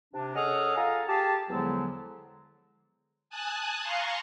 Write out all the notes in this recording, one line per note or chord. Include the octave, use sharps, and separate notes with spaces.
C3 D4
C#4 G#4 A4 D#5 F#5 F6
F4 A4 F5 G#5 A#5
G4 G#4 A5
E2 D3 F3 F#3 G#3 B3
G#5 A5 D#6 F#6
F5 A#5 C6 C#6